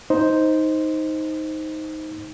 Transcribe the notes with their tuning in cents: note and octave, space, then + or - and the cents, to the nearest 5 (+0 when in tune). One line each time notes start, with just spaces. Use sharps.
D#4 +10 C5 +0